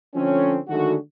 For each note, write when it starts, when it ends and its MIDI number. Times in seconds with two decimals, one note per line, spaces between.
0.14 0.58 50
0.14 0.58 53
0.14 0.58 57
0.14 0.58 60
0.14 0.58 61
0.68 0.95 50
0.68 0.95 51
0.68 0.95 54
0.68 0.95 56
0.68 0.95 57
0.68 0.95 66